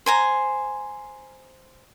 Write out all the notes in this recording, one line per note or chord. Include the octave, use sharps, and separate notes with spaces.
C5 G#5 A#5